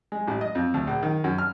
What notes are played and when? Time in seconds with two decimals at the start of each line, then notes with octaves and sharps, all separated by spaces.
0.12 G#3
0.28 A1
0.41 D#5
0.55 F2
0.74 D2
0.87 A#1
1.03 D#3
1.24 F#2
1.38 F6